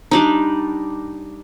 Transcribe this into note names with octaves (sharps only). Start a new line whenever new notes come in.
G3 D4 D#4